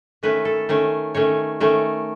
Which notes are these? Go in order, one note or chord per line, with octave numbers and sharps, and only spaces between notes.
D#3 A3 C#4 B4
A4
D#3 A3 C#4
D#3 A3 C#4 C#5
D#3 A3 C#4